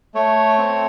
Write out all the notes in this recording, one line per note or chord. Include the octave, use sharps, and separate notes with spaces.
A3 C#5
C4